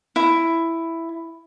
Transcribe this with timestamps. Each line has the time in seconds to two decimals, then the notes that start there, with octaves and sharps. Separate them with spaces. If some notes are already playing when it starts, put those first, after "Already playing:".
0.16 E4